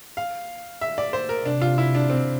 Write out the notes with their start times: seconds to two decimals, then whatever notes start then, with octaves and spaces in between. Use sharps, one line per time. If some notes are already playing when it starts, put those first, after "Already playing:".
0.17 F5
0.81 E5
0.98 D5
1.13 C5
1.29 A#4
1.46 C3 D4
1.61 F4
1.78 E4
1.95 D4
2.10 C4